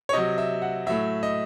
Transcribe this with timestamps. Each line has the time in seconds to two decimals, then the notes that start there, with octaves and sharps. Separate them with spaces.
0.09 C#5
0.13 C3 F#3 D#5
0.38 E5
0.62 F#5
0.86 A2 F#3 E5
1.23 D#5